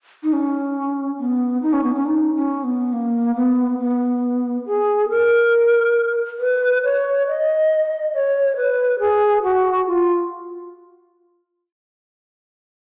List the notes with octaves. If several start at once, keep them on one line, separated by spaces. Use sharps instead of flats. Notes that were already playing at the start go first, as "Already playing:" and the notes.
D#4
C#4
B3
D#4
C#4
B3
C#4
D#4
C#4
B3
A#3
B3
B3
G#4
A#4
B4
C#5
D#5
C#5
B4
G#4
F#4
F4